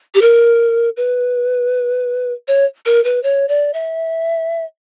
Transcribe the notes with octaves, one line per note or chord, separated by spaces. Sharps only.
G4
A#4
B4
C#5
A#4
B4
C#5
D5
E5